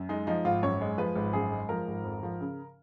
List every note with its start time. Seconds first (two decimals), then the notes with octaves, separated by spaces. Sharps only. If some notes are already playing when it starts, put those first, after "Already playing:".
Already playing: F#2
0.09 G#3 D#4
0.27 F3 D#4
0.44 G#1 F4
0.63 F#2 C#5
0.81 G#3
0.98 F3 B4
1.15 G#1
1.33 F#2 G#4
1.52 G#3
1.69 F3 A#4
1.88 G#1
2.04 F2
2.23 F3
2.41 C#3